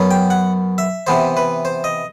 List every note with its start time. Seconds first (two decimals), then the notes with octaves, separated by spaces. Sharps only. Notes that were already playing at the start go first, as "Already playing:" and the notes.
Already playing: F#2 F#3 B3
0.11 G5
0.30 F#5
0.78 E5
1.07 C3 E3 B3 C5
1.37 B4
1.65 C5
1.84 D#5